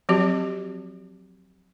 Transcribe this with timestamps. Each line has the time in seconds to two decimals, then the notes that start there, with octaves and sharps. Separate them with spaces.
0.09 F3 F#3 C4 F#4 G4